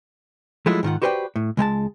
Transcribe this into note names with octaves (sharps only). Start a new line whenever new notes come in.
F3 F#3 G#3 A3 E4 F4
G#2 D#3 F4 F#5
F#4 G4 B4 C5 D5 G5
A2
C#2 G#3 G5 A5